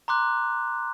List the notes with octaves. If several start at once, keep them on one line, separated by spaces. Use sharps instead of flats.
A#5 C6 D6 F#6